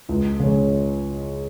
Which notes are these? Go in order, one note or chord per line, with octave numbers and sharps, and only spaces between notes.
C#2
C#3 G#3 C#4